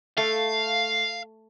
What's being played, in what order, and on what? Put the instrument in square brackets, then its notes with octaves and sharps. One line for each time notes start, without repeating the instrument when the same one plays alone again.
[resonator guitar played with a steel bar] A3 [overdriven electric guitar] F5